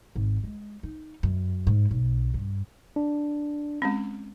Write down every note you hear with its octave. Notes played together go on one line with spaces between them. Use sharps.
G#1
G#3
D#4
F#2
G#2
B1
G2
D4
G#3 C4 C#4